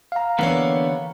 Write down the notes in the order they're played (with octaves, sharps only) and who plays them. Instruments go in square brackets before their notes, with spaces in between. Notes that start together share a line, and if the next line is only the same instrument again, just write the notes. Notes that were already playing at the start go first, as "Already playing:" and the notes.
[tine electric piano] F5 A#5
[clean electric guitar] D3 A#3 B3 [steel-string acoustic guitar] E3 G4 C#5